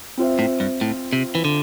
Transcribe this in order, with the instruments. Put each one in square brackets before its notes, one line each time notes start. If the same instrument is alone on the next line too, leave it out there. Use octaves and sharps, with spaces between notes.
[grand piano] C4 F4 C5 E5
[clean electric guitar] A2
G2
A2
C3
E3
D3